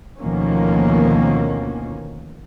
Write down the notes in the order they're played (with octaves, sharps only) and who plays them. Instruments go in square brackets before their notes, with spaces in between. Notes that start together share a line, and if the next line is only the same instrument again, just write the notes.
[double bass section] D2 B2 D#3 F3 A#3 C#4